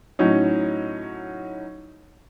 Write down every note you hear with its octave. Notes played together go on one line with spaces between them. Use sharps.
A2 F#3 C#4 D#4